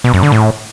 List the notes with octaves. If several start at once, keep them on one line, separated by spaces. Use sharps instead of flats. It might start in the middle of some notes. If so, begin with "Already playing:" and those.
B2
F#2
D3
A2